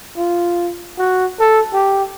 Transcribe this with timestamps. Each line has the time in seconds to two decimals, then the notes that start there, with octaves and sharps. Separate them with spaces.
0.17 F4
0.98 F#4
1.40 A4
1.74 G4